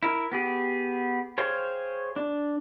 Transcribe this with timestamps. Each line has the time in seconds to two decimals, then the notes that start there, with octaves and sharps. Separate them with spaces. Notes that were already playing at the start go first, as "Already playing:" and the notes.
0.03 E4 A#4
0.32 B3 G4 G#4
1.38 G#4 C5 C#5 F5 G5
2.16 D4